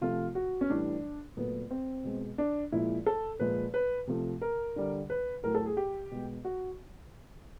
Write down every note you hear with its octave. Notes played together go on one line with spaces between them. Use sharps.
C3 F3 A3 F4
F#4
C#4
A2 E3 G3 D4
A#2 F#3 A3 B3
C4
B2 G#3
D4
A#2 F3 G#3 E4
A4
A#2 F3 G#3 B4
B4
C3 F3 A3
A#4
D3 G3
B4
A2 F#3 A3 A#4
A4
G#4
G4
B2 G#3
F#4